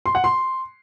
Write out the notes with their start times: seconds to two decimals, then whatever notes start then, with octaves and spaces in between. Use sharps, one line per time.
0.06 C6
0.15 F#5
0.24 C6